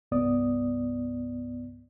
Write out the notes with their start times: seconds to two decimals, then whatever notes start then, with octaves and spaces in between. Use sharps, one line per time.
0.12 C2 G2 B3 D5 D#6